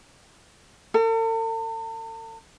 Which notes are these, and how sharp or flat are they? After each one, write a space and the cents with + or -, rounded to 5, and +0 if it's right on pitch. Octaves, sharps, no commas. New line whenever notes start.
A4 +45